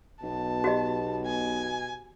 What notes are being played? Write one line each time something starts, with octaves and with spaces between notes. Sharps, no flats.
B1 B2 A5
F#4 G4 D#5
G#5